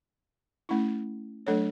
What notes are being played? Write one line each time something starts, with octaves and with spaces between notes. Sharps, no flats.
A3 C#4 E4
F#3 A3 D4 A4 C#5